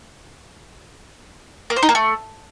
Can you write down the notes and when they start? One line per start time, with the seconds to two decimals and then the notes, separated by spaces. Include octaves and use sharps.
1.70 A#3
1.76 C5
1.83 D#4
1.89 A#3
1.95 A3